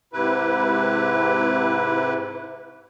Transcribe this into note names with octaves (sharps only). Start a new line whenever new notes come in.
G#2 C3 E4 B4